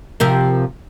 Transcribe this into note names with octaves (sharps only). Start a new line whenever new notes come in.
C3 F3 A#4